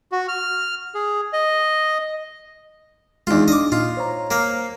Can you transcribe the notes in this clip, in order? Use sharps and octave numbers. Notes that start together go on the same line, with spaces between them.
F#4
F6
G#4
D#5
E2 G#3 D4 D#4 F4
D4 D#5 D6
A#2 D#4 F4 D#5
C5 C#5 A#5
A#3 F5